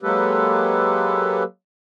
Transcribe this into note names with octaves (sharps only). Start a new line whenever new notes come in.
F#3 G#3 A#3 G4 A4 B4